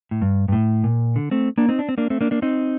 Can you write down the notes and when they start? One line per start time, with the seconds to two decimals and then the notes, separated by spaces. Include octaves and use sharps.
0.11 A2
0.22 G2
0.48 G2
0.52 A2
0.84 A#2
1.16 D3
1.31 A3 C4
1.58 A#3 D4
1.69 C4 D#4
1.79 D4
1.89 C4
1.98 A#3 D4
2.10 A3 C4
2.21 A#3 D4
2.31 A#3 D4
2.42 C4 D#4